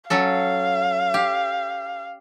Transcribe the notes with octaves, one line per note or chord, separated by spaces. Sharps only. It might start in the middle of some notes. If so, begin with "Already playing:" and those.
F#3 C#4 A4 F5
G4